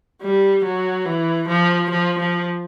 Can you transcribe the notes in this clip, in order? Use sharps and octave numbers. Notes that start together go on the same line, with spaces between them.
G3
F#3
E3
F3
F3
F3